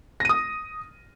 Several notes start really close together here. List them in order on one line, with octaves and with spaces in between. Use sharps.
A#6 D#7 D#6